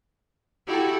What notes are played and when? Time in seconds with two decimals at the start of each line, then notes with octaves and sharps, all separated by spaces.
0.67 E4 F#4 G4 A4